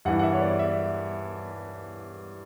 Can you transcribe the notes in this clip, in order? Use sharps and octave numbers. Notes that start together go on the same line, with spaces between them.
G2 E3 F#5
F#5
E5
C#5
D5
E5